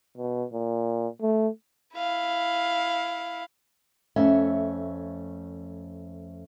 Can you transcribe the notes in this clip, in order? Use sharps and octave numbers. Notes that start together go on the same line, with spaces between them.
B2
A#2
A3
E4 F5
F2 A3 C#4 E5